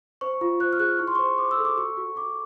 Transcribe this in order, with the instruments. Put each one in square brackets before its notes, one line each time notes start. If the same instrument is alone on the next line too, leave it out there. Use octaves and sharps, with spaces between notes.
[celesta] C5 C#6
F4
C5 F#6
F6
G#4 F#6
E4 C#6
C6
C5 C#6
C5 D6
E6
A4
D6
F#4 C#6
F#4
F#4 D6